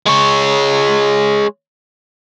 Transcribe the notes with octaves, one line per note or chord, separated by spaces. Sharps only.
G#3 C#5